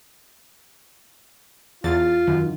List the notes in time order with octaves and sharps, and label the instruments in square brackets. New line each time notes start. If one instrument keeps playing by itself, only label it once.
[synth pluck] E2 A6 [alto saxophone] F4
[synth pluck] F#2 [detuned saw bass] D#3